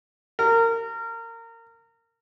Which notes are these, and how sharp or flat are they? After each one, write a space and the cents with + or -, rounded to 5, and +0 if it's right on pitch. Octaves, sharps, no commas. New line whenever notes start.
A#4 -25